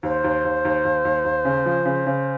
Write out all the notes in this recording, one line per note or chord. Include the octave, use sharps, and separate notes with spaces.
D#2 C5
D#2
D#2
D#2
D#2
D#2
D#2
C#3
F3
C#3
C#3